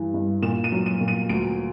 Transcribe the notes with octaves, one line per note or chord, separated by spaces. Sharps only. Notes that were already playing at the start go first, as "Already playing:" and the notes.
Already playing: G2 E3
G2
A#2 E7
D#7
F#3
D#7
A#2
D#7
D2 D7